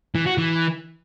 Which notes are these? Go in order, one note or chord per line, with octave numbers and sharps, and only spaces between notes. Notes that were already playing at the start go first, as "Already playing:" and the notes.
E3
F#4
E3